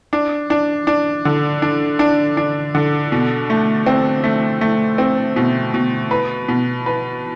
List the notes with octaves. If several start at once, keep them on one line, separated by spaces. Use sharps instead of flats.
D4
D4
D4
D3
D4
D4
D4
D3
B2
A3
C4
A3
A3
C4
B2
B2
B4
B2
B4